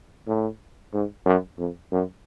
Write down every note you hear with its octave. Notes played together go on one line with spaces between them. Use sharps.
A2
G#2
F#2
F2
F#2